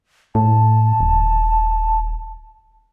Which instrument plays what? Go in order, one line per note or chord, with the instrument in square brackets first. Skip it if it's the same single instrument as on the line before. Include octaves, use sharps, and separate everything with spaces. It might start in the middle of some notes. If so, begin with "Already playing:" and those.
[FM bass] A2 [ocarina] A5
[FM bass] D#1